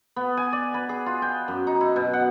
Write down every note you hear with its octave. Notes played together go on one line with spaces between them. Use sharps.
B3
G#5
D5
B4
G#4
F4
G5
F#2
D#4
E4
B2
F#5